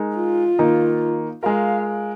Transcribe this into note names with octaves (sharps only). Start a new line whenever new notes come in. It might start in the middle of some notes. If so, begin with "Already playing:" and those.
Already playing: G#3 D#4 A#4
F4
D#3 A#3 D#4
G#3 F4 A#4 F5